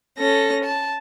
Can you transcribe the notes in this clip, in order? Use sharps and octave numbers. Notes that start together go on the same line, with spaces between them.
C#4 A4 A#6
A5